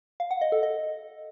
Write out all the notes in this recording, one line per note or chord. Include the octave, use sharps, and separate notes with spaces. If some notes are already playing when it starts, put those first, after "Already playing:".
F5
F#5
D#5
A4
D#5